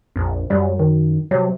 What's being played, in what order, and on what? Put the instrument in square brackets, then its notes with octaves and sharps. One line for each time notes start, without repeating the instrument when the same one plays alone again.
[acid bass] A#1 [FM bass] F2
[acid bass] F#2 [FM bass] G3
[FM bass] D#3
[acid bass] C3 [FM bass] F#3